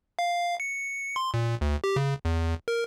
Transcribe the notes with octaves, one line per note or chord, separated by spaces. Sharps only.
F5
C#7
C6
A#2
D2
G4
C#3
E2
A#4